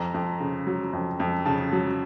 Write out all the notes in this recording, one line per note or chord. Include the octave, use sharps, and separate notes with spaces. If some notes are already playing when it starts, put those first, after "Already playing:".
Already playing: F2 A#5
F2
C#3
F#3
F2
F2
C#3 A5
F#3